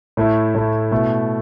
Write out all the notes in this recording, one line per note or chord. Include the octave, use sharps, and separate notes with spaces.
A2 A3 E4
A2 A3 E4
B2 A3 E4